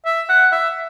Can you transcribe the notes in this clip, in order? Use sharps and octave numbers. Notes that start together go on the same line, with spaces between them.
E5
F#5
E5